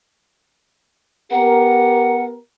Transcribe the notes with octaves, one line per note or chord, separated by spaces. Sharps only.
B3 G4 A#4 F#5